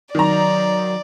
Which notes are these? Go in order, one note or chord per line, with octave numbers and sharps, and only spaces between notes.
D#3 F#3 D5 A#5